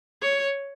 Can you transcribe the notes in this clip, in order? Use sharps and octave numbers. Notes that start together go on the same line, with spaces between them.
C#5